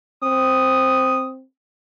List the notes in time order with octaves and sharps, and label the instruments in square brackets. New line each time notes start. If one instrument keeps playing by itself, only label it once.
[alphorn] C4 [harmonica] D#6